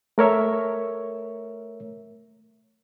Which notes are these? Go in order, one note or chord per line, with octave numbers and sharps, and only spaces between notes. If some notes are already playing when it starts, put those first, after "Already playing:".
A3 A#4 C#5 E5